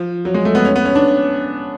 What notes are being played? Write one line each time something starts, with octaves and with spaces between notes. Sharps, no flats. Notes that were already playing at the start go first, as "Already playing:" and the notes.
Already playing: F3
F#3
G#3
A3
B3
C#4
B3
C#4
D4